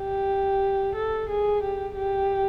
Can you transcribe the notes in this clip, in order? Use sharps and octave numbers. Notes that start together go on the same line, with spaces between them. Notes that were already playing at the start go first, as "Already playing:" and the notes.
Already playing: G4
A4
G#4
G4
G4